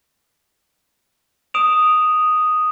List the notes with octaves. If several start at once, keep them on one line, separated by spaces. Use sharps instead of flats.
D#6 D7 E7 F7